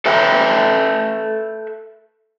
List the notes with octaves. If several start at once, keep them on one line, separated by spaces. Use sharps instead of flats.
A4 B4 E5 G5